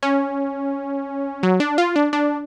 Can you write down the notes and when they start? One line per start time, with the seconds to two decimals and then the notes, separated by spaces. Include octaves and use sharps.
0.03 C#4
1.43 F#3
1.60 D4
1.78 F4
1.96 D4
2.13 D4